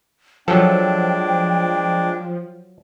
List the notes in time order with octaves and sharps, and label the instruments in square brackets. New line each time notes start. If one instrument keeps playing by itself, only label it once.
[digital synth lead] F3 [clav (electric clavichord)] F#3 A4 [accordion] G#3 D4 [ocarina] G5